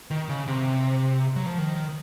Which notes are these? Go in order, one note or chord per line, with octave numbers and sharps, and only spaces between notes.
D#3
C#3
C3
F#3
F3
D#3